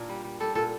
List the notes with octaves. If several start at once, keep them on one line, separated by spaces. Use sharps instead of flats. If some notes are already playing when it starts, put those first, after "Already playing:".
Already playing: A#2 D4 A#4
G3
G3
G3 A4
A#2 A4